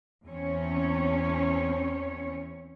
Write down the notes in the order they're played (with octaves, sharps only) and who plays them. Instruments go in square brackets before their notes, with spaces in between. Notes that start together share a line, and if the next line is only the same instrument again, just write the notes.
[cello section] E2 C4 C#4 C#5